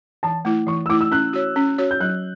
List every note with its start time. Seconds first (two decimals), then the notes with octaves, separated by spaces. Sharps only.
0.23 E3 A5
0.45 A3 E4
0.67 E3 C#6
0.86 E6
0.90 A3 E4 D6
1.01 E6
1.11 C#4 F#6
1.33 F#4 C#5
1.56 C#4
1.78 F#4 C#5
1.91 G6
2.00 F#3 F#6